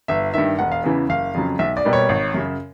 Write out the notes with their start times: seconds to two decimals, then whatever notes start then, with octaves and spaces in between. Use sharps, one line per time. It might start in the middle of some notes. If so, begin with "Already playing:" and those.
0.08 G1 E5
0.34 G2 D#3 E5
0.59 E1 F#5
0.72 F5
0.84 E2 C#3 E3
1.09 F#1 F5
1.34 F2 C#3 F#3
1.59 B1 E5
1.77 D5
1.85 B2 G3 A#3
1.93 C#5
2.09 G#1
2.34 F#2 C#3